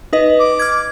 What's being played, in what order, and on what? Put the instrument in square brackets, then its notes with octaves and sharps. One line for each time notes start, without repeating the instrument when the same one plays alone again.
[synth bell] D#4 B4 D#5
[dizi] D6
[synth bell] F6 G#6